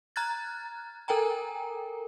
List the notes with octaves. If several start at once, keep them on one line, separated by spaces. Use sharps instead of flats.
A#5 F6 F#6 G#6 A6
A4 A#4 G5 G#5 A#5